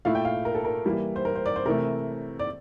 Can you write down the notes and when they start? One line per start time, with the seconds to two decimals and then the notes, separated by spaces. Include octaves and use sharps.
0.05 A#2 A3 E4 F5
0.15 G5
0.25 F5
0.45 A#4
0.55 A4
0.65 A#4
0.85 E3 G3 A#3 E4
1.16 C5
1.25 A#4
1.36 C5
1.46 D5
1.56 C5
1.65 C3 E3 A3 A#4
2.39 D5